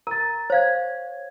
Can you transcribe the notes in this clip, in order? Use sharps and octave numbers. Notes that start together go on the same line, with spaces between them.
A#4 A#5 A6
C5 C#5 F5 G#6